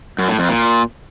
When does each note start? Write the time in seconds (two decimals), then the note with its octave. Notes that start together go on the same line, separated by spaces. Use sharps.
0.18 F#2
0.29 A2
0.39 F2
0.49 A#2